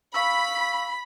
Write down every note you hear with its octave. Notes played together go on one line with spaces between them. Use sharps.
F5 B5 C#6 E6